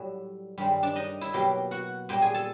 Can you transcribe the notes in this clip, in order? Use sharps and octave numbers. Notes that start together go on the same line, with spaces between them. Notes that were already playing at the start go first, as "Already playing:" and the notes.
Already playing: A2 F#3 G3 A3 G4
G2 D#3 G3 G#3 G4
D4 D5
D#4 D#5
E4 E5
B2 F#3 A#3 G4 G5
F#4 F#5
A#2 G3 A#3 G4 G5
G#4 G#5
A4 A5